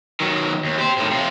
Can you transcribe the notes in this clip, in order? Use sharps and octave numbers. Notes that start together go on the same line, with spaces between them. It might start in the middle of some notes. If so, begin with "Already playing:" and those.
D#3 F#3
D#2
G4 C5
A2 D#3
C3 F4